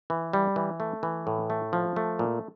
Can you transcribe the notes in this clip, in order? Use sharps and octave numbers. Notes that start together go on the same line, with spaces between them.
E3
G3
E3
A3
E3
A2
A3
F3
A3
A#2